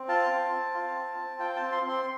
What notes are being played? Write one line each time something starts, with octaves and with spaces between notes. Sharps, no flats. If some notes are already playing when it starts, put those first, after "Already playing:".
Already playing: C4
F4 A5
C4
C4
F4
C4
C4
F4 G5
A5
C4
C6
C4
C6